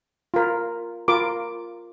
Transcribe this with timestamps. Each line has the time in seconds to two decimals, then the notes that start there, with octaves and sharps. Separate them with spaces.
0.34 F4 A#4
1.08 F4 A#4 D6